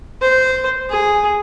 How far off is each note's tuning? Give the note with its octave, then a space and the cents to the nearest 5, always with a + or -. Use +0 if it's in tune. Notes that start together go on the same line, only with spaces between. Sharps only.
C5 -15
G#4 -5